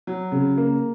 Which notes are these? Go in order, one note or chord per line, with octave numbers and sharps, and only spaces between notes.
F#3
C#3
A#3